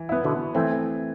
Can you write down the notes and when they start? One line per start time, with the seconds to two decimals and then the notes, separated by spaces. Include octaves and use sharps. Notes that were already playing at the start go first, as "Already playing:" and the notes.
Already playing: E3
0.09 B3 E4
0.24 B2 D3
0.55 E3 A3 C4